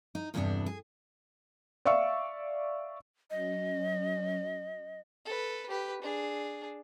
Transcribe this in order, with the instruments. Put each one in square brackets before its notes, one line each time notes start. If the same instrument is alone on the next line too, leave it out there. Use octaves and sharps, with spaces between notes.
[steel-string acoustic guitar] D#4
E2 G2 C3 E3 B3 D4
G#4
[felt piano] D5 E5 F5 C#6 E6
[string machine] F#3 C#4 [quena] D#5
[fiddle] A4 B4
G4 B4
D4 G#4